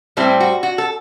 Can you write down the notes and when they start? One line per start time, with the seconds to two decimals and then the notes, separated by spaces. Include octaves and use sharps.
0.17 A2 G3 C4 E4
0.40 F#4
0.63 F#4
0.78 A4